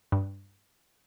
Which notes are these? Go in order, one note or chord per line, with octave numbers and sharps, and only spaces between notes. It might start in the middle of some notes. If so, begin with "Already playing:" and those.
G2